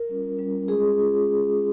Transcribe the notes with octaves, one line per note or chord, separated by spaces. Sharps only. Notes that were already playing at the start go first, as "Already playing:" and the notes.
Already playing: A#4
G3 C#4 F4
G3 C#4 F4
G#3 C#4 F4 G#4
G#3 C#4 F4